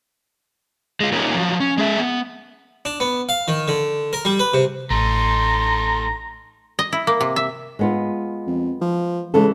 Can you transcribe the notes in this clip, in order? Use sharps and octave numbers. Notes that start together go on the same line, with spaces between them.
G#3 F4
A#3 C#4 D#4 F4 G4
F3 F#3
C#4
G#3 G#4 E5
B3
D4
B3
F5
D#3
D3
A#4
G3
B4
C3
A1 A3 D#4 A#5 C6
D#5
E4
A#3
C3
E5
G#3 B3 F4
F2
F3
C#3 E3 G#3 A4